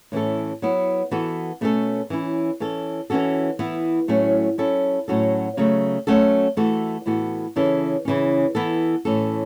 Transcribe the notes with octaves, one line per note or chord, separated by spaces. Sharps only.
A2 E3 C#4 E4 A4
F#3 B3 E4
E3 B3 F#4 A4
B2 A3 C#4 A4
E3 C#4 E4
E3 C#4 A4
E3 C#4 F#4 A4
E3 B3 E4
A2 F#3 A3 C#4
F#3 C#4 E4 A4
A2 F#3 C#4 F#4 A4
C#3 F#3 A3
F#3 A3 C#4 F#4 A4
E3 A3 F#4 A4
A2 E3 B3 F#4 A4
C#3 E3 C#4 E4 A4
C#3 E3 C#4
E3 B3 E4 A4
A2 E3 C#4 A4